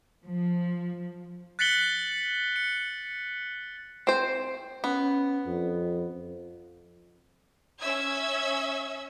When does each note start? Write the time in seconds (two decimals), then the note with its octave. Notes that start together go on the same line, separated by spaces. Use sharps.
0.22 F3
1.59 F#6 A6 B6 C#7 F#7 G7
2.56 C#7
4.07 C4 C5
4.84 B3 C#4
5.46 F2
7.80 C#4 E5 E6 G#6